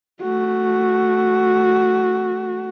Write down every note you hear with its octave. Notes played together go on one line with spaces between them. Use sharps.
A3 F#4